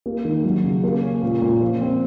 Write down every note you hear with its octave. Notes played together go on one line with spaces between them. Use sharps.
A#3
D#3
F#3
C#3
A#3
C#4
A#2
A#2
F3
C4